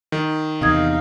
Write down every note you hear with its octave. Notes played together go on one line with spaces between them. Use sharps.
D#3
E2 C3 D#4 D#5 F5 D#6 G#6